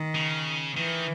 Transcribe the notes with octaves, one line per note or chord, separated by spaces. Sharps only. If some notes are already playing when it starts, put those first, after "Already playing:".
Already playing: D#3
C#3
D#3 E3